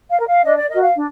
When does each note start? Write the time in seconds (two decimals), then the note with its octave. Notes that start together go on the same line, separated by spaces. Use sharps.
0.10 F5
0.18 A#4
0.26 F5
0.44 D4 D#5
0.56 D5
0.69 F#4 A#4 D#5
0.81 F5
0.95 D4